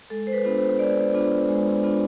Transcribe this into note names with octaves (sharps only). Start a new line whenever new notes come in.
G#3 A4
C5
B4
B3 D4 F4
C5
G#3 D5
B3 D4 F4
G#3
B3 D4 F4